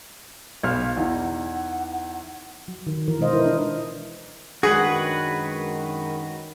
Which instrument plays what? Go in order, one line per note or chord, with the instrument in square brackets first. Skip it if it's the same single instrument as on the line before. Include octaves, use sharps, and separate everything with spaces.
[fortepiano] B1 F6 [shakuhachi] F5
[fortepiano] E2 E3 D#4 [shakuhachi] F#5
[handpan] F#3
D#3
E3 A#4
B2 G#3 D#4 C5 D#5 F5
E4 A#4 B4
D4 F4
[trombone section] F#2 D#3 [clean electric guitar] G#3 D4 [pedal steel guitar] F#4 B4 F#5 [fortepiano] G#4